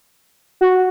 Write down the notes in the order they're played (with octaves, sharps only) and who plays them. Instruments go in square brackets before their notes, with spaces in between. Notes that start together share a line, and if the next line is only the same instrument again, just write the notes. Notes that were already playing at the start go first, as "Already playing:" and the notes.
[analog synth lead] F#4